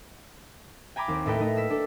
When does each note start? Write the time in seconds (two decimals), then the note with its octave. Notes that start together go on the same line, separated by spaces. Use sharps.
0.96 G5 G#5 A#5 B5 D6
1.08 D#2 C4
1.25 A2 A3 D#4 A4 B4 G5
1.39 A3 D#4 D#5
1.56 A#3 E6 B6
1.70 D4 A4